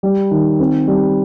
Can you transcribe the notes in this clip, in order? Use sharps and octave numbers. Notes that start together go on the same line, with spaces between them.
G3
D#3
C4
G3